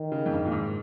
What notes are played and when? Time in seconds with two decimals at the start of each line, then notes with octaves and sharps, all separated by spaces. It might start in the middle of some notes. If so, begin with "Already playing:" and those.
Already playing: D#3
0.12 C#3
0.26 F2
0.32 G2
0.45 A#2
0.52 G#2